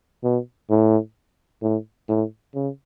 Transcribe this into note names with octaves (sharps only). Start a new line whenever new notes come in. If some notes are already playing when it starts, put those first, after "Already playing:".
B2
A2
A2
A2
C#3